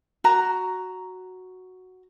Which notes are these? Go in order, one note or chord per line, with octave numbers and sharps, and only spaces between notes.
F#4 A#5